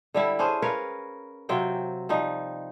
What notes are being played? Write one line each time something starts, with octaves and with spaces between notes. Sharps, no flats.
D3 G3 E4
C#4 D4 G#4 C5
A#4 B4 C#5 F5
C3 F#3 F4 G5
F3 G3 D#4